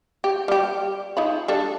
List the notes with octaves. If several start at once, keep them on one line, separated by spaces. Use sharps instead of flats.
G4
G3 G4
D#4 F4 B5
G3 D4 A4